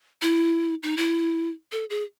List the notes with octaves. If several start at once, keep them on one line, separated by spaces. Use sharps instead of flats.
E4
D#4
E4
A4
G#4